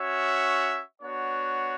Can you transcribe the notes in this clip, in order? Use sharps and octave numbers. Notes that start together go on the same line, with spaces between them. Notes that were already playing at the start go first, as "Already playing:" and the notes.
Already playing: C#4 F#4 C#5 E5
B3 D4 F#4 C#5